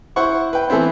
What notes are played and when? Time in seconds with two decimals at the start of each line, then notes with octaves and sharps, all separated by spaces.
0.16 E4 C5 F#5 C#6
0.53 B4 G5
0.69 E3 A3 B3 C4 E4